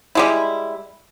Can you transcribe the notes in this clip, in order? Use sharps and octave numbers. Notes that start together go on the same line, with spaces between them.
G3 G#3 E4